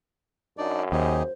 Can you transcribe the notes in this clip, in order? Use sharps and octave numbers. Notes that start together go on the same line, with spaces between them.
F#2 D4 D#4 D5
D#2 D#4 G4 G#4 C5